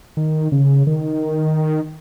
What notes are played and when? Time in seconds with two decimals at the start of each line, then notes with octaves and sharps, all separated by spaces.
0.17 D#3
0.52 C#3
0.87 D#3